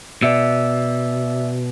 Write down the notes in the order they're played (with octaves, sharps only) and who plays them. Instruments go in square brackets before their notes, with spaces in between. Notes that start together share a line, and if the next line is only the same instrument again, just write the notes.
[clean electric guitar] B2 [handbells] D5 E5 E6